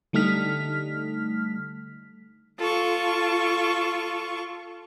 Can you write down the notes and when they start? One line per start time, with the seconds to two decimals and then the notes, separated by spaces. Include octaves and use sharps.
0.13 D3 G3 A3 D#4 F6 B6
2.58 F4 A4 C#6